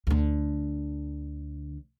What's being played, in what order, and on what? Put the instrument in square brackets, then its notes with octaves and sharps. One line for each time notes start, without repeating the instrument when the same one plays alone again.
[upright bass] D2 D3